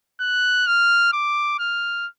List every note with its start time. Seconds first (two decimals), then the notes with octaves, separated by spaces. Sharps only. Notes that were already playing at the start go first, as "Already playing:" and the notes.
0.20 F#6
0.67 F6
1.13 D6
1.59 F6